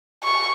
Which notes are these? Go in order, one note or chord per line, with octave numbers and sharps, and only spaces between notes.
C#6